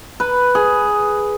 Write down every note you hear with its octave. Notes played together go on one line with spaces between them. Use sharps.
B4
G#4